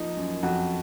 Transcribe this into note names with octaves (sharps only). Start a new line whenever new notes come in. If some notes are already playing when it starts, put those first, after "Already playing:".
Already playing: F3 A#3 D#4
F#2
F2 F#4